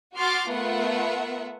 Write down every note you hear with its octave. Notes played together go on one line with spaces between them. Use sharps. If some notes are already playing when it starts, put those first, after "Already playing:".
F#4 C6 D6 F6 A6
A3 B3 F4 A#4 E5 F#5